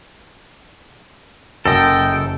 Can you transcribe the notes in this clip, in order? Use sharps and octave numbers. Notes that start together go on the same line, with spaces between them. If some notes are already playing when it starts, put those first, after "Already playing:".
F#1 F#2 A4 D#5 G5